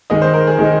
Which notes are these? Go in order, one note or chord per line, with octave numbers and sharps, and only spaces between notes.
D#3 G#3 D#4 D#5
C5
A#4
G#4
D#3 G#3 D#4